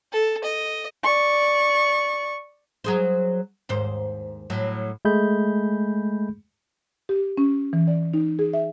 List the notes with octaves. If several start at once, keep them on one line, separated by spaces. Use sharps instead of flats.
A4
D#5
D5 C#6
F#3 G#4 C5
D#2 G#2 C5
A2 F#3
G#3 A3 G#4 B5 G6
G4
C#4
E3
D5
D#4
G#4
E5